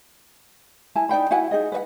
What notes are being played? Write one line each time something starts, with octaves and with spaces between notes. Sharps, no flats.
E4 G#5 A5
D#4 D5 G5 B5
E4 F#4 F#5 G#5
D#4 G#4 D#5
B4 D#5 F#5